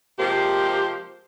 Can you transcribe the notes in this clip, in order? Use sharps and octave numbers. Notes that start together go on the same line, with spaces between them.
C3 F3 G#3 A#3 G4 C5